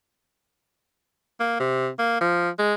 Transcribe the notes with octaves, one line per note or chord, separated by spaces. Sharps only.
A#3
C3
A#3
F3
G#3